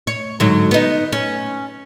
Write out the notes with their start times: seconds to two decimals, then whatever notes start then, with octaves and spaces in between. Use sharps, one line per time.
0.07 C#5
0.40 G#2 D3 F#3
0.71 B3 D#4
1.12 C#4